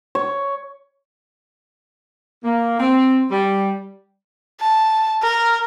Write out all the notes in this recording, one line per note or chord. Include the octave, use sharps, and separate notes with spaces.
C#5
A#3
C4
G3
A5
A#4